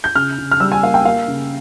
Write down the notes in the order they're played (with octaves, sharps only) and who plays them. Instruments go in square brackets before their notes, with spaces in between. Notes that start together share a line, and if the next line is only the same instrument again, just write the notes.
[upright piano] G6
C#3 F6
C#3
F6
G3 E6
G#5
A#3 F5
G5
A#3 F5
C#3